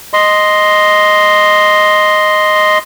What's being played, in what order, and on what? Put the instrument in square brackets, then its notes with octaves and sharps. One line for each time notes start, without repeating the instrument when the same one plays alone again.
[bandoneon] D#5 C6